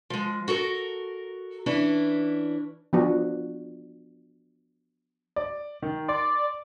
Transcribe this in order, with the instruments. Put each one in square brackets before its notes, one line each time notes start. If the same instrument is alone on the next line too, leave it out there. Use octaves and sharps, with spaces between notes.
[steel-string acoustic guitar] F3 G#3
F#4 A4 A#4
E3 C#4 D4 E4
[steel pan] F3 B3 D4 F#4
[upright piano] D5
D#3
[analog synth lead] D5 [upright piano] C6